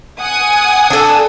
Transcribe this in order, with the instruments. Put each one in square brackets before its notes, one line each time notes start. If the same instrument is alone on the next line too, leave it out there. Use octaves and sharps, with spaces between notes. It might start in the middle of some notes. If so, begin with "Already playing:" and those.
[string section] F#5 G#5 D#6
[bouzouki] D4 A4